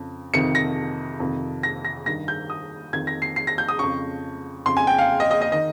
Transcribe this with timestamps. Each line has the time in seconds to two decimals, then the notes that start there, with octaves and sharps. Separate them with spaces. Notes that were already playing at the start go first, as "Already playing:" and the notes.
Already playing: F2 C#3
0.34 F2 C3 D#3 C#7
0.55 A#6
1.20 F2 C3 D#3
1.63 A#6
1.85 A#6
2.06 G2 D#3 A#6
2.28 G6
2.50 D#6
2.93 F2 D#3 G#6
3.07 A#6
3.22 C7
3.36 C7
3.47 A#6
3.58 G6
3.69 D#6
3.79 F2 C#3 C#6
4.66 F2 C#3 C6
4.77 G#5
4.87 G5
4.99 F5
5.20 D#5
5.31 D#5
5.41 D#5
5.52 D#3 D#5